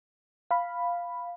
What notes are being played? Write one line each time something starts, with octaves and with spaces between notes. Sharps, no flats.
F5 B5